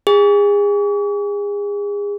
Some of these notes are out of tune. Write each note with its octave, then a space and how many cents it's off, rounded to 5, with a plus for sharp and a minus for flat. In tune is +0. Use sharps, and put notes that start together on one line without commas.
G#4 -30